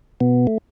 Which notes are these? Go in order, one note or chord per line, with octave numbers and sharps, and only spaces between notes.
B2 B3
A3